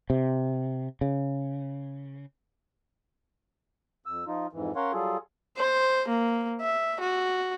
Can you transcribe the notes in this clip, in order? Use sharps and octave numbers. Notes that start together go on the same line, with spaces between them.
C3
C#3
F2 E6
F3 D#4 F4
F2 G#2 E3
C#4 A#4 C#5 F5 F#5 C6
F#3 G3 F4 G#4 A4
C5
A#3
E5
F#4